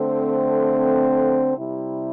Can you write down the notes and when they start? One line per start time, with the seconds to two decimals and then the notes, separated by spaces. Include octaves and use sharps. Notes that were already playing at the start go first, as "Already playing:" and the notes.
Already playing: D3 A3 C4
1.55 C3 G3 E4